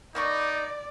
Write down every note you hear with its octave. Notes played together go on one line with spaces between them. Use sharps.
A#3 D#4 D5 B5 C#6